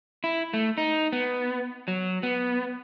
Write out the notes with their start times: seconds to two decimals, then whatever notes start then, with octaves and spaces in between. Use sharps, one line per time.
0.24 E4
0.54 A3
0.78 D#4
1.13 B3
1.88 F#3
2.23 B3